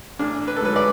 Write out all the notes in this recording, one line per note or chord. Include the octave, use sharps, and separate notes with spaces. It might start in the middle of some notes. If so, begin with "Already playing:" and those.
A1 D4
B4
A4
G#2 F#3 B4
D5